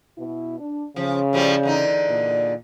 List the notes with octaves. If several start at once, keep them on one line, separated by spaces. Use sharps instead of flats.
B2 E4
D4
C#3 F3
A2 F3 G3
E2 D3 D#4
A#2